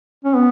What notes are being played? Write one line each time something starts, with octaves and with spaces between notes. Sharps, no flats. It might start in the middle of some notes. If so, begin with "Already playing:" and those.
C#4
B3